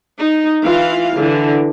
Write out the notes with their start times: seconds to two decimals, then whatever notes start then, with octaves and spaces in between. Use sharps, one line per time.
0.18 D#4
0.64 E3 F4 F5
1.17 D3 E3